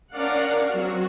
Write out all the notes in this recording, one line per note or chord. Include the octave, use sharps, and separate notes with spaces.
C#4 D4 A#4 D5 F5 F#5
F#3 C4 F#4